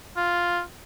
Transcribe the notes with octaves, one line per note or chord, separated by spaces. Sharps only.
F4